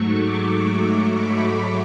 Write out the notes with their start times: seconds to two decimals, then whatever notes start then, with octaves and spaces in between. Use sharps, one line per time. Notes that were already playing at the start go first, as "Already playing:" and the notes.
Already playing: G#2 F#3 A3 C#6
0.20 D6
0.51 C#6
0.83 C#6
1.14 B5